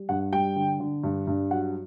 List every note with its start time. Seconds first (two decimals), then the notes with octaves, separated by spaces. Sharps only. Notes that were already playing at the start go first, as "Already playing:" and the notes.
Already playing: G3
0.09 G2 F#5
0.32 G3 G5
0.56 D3
0.80 D3
1.04 G2
1.27 G2
1.51 F#3 F#5